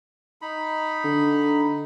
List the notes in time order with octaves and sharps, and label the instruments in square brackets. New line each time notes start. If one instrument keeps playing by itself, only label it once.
[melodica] D#4 B5
[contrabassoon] D3